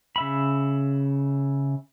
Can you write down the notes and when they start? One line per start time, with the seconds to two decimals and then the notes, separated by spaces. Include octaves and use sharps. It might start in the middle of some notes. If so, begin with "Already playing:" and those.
0.16 C#3 E5 B5